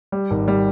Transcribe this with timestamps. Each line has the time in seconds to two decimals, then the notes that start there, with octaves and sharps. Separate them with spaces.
0.12 G3
0.31 G#1
0.48 G3